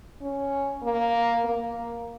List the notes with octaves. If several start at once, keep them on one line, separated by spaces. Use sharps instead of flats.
C#4
A#3
A#3